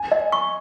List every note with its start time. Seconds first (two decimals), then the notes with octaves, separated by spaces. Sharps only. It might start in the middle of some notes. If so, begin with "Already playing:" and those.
Already playing: G#5
0.12 D#5
0.32 C#6